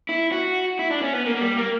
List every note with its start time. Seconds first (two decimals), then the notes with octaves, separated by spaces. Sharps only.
0.09 E4
0.32 F#4
0.79 E4
0.90 D4
1.02 C#4
1.13 B3
1.26 A#3
1.36 A#3
1.41 G3
1.57 A#3